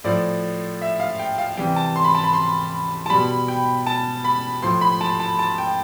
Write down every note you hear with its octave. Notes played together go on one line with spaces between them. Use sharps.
A2 F3 D5
E5
F5
G5
F5
C3 E3 G3 G5
A5
C6
B5
A5
B5
C6
A5
B2 G3 B5
G5
A5
B5
A2 F3 C6
B5
A5
A5
A5
G5